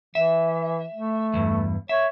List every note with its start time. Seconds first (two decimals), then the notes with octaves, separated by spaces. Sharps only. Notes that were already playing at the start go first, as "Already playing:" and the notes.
0.15 E3 E5
0.94 A3
1.33 E2 G2
1.89 C#5 E5